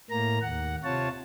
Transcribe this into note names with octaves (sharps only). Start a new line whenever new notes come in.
A2 A#3 A#5
D#2 F#5
C3 F4 C#5 A5